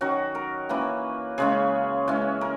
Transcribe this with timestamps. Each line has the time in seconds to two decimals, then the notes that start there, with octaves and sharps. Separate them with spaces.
0.01 D#3 F#3 C#4 F#4
0.35 A#4
0.69 E3 A#3 C#4 B4
1.38 C#3 G#3 C#4 G#4
2.08 E3 G#3 C#4
2.41 A#4